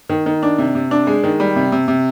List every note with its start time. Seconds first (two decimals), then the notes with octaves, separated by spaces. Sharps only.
0.10 D#3
0.26 D#3
0.43 D4
0.58 C3
0.75 C3
0.91 D4
1.07 G#3
1.24 D#3
1.40 G3
1.56 C3
1.72 C3
1.88 C3